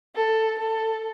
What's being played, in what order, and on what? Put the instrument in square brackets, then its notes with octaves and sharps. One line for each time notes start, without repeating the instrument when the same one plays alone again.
[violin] A4
A4